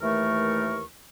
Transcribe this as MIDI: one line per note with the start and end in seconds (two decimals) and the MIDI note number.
0.01 0.83 39
0.01 0.83 52
0.01 0.83 57
0.01 0.83 70
0.01 0.83 85